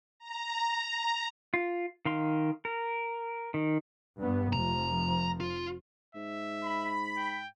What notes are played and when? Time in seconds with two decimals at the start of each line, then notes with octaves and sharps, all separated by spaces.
0.19 A#5
1.54 F4
2.05 D#3 F5 C6
2.65 A#4
3.54 D#3
4.19 G2 B3
4.53 F1 F3 A#5
5.40 F4
6.15 G#2 E5
6.65 B5
7.17 G5